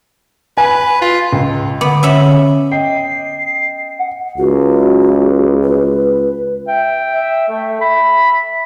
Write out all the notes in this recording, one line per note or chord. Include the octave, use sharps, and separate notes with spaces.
B4 G#5
F4
C#2
D3 B3 D6
C#4 E5 B5
D#5 G5 C7
F#5
C#2 F#4
B4
E5 G5
E5
A3
E5 B5